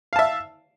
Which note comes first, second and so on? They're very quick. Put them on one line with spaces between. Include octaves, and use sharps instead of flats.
F5 A5 E5